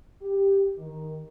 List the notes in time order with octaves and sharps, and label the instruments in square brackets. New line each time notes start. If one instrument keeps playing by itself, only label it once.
[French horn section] G4
D#3